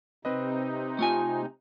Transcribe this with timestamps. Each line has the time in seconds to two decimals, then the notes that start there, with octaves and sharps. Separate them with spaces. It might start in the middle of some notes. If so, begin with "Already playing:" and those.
0.25 C3 C4 D#4 B4 D#5
0.99 A3 F4 G#5